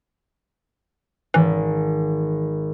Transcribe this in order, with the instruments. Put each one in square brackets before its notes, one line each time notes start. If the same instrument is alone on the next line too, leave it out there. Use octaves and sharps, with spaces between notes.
[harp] G#1 [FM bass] E3